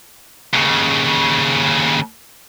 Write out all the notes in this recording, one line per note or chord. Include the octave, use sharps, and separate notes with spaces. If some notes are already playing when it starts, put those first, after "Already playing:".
D#2 C#3